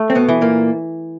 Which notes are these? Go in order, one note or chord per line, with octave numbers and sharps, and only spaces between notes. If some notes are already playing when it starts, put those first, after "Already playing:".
Already playing: A3
C4
B2 B3
E3
A#2 A#3